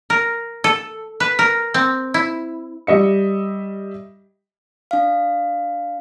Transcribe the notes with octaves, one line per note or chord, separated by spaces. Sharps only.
A#4
A4
B4
A#4
C4
E4
G3 D#5 E5 C#7
D4 F5